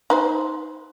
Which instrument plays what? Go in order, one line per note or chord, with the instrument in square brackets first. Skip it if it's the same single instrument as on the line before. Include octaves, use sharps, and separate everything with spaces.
[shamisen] D#4 B4 C5